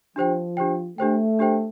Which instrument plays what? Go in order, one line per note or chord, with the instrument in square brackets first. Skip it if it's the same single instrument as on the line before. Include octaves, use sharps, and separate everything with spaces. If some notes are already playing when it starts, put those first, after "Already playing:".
[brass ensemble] F3 [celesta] D4 G4 C5 G5
[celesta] D4 G4 C5 G5
[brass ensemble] A3 [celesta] D4 G4 C5 G5
[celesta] D4 G4 C5 G5